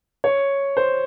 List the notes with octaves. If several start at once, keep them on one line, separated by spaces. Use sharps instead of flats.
C#5
C5